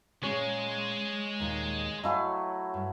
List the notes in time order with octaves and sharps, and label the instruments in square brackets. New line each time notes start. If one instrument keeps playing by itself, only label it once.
[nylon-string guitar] A#2 C#4 G#4 [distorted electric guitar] G#3 [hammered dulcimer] C#5
[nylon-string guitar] D#2 A#2
[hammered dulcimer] F#3 A3 E4 [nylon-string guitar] D#5 F5 G#5
[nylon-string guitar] G2